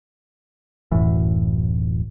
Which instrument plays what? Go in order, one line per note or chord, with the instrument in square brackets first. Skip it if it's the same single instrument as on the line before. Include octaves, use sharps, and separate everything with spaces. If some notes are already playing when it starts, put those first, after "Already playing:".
[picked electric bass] D1 F#2 A2 E3